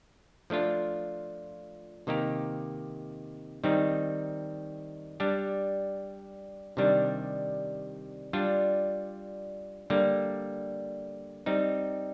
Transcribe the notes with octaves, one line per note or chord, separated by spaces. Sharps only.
F3 A3 D4 F4
C3 D#3 A#3 D#4 G4
D#3 G3 C4 D#4
G3 D4 G4
C3 D#3 G3 D4
G3 D4 F4
D3 G3 A#3
G3 C4 D#4